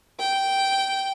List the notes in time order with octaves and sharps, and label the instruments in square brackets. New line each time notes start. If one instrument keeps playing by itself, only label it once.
[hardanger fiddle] G5